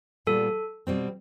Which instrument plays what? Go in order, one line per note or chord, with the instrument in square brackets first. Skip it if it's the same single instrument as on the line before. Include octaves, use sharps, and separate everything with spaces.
[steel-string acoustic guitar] A#2 G3 B3 [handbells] A4
[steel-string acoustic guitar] B2 G3 C4